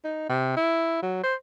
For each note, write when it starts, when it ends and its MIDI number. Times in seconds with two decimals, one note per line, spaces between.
0.04 0.25 63
0.29 0.52 48
0.56 1.00 64
1.02 1.20 54
1.23 1.35 72